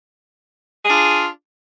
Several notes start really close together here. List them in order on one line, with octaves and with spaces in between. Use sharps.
G#4 D4 F4